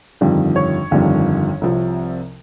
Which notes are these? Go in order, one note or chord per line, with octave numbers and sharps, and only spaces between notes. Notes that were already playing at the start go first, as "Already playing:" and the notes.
G1 F2 D#3 G3
C#5
G1 F2 D#3 G3
C2 C3 F3